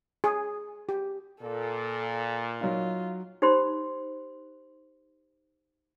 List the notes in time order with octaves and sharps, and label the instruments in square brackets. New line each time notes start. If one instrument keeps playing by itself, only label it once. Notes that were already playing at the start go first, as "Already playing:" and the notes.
[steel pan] G#4
G4
[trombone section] A#2 [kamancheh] A4
[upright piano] F#3 D#4 [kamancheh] F4
[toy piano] D#4 G4 C5 B5 C6